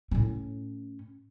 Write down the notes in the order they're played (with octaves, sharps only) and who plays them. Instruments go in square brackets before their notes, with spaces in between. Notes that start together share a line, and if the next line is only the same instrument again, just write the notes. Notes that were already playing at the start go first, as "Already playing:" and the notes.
[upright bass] A2 C#4